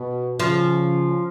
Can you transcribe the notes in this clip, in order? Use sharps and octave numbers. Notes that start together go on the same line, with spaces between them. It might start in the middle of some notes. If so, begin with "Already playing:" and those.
Already playing: B2
C#3 F3